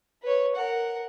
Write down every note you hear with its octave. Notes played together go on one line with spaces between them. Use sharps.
B4 C#5
A#4 F#5